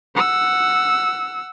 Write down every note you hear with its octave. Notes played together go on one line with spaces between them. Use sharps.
F#5 E6